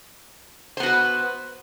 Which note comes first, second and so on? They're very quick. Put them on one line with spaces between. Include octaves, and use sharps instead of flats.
C5 B3 F#4 B4